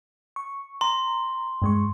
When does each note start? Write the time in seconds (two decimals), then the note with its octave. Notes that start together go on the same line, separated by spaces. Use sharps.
0.36 C#6
0.81 A#5 C6
1.62 G2 G#3 C#6